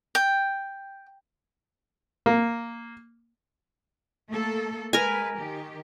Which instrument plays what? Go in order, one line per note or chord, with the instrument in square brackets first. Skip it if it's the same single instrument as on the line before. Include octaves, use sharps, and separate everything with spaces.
[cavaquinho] G5
[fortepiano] A#3
[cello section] A3 A#3 A4
[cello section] G#3 B4 [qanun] A#4 G#5
[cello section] D#3 G4